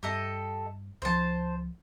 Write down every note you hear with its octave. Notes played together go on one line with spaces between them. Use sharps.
G2 G4 A4 D#5
C#2 F3 C5 A5